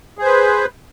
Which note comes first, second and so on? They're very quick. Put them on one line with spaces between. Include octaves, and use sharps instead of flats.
G#4 C5 B4